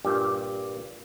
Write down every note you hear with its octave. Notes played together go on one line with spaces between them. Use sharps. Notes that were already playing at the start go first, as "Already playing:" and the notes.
G2 A#2 G4